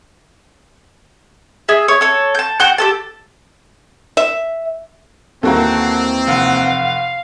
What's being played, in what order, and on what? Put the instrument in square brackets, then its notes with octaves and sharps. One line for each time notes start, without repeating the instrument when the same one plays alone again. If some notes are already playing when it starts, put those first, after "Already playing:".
[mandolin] G#4 E5
C#5
A4 C#5
A5 G6
F#4 F#5 G5 F#6
G4 A4 A5
[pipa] E5
[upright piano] D#2 A#4 A#5 [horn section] E3 C4 [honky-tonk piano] A#3 F#4 A4
[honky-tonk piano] F1 F#5 [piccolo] F5